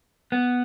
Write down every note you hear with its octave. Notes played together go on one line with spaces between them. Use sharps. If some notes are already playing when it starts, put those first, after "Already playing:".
B3